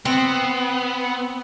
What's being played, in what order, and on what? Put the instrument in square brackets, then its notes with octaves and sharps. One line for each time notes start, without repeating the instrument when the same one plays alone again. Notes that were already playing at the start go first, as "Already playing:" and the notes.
[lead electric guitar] B3 [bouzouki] C4